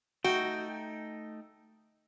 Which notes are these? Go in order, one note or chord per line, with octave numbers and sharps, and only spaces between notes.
A3 D#4 F#4 G5